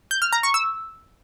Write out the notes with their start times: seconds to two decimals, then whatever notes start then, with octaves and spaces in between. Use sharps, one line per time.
0.11 G6
0.22 F6
0.33 A#5
0.43 C#6
0.54 E6